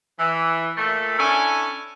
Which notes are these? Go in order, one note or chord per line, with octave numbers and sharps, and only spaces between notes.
E3
A#2 A3
C#4 D4 E4 A4 G#5